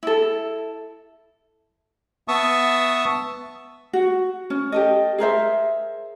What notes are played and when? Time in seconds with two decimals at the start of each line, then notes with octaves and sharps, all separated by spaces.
0.03 E4 A4
2.28 B3 E5 A5 C#6 D#6
3.93 F#4
4.50 C#4
4.72 G4 A4 D#5
5.18 G#4 A#4 C5 E5